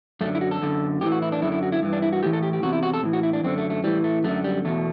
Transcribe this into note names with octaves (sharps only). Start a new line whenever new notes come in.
F#2 D3 A3
E4
F#4
A4
F#2 D3
A2 E3 G4
F#4
E4
D4
F#2 D3 E4
E4
F#4
E4
G2 E3
D4
E4
F#4
A2 E3 G4
A4
G4
G4
E2 C3 F#4
E4
F#4
A4
A2 E3
F#4
E4
D4
F#2 D3 C4
A3
A3
A2 E3 G3
A3
F#2 D3 A3
G3
E2 B2 A3